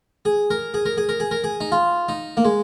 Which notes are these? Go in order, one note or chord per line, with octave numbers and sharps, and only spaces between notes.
G#4
A#4
G#4
A#4
G#4
A#4
G#4
A#4
G#4
D#4
F4
D#4
A#3
G#3